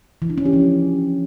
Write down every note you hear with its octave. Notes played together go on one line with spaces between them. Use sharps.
E3
D4
C#4
G4
F3